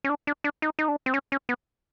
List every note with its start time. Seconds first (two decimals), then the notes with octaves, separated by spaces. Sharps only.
0.04 C#4
0.10 D4
0.27 D4
0.44 D4
0.62 D#4
0.79 D#4
0.88 D4
1.06 C4
1.14 C#4
1.32 C#4
1.49 B3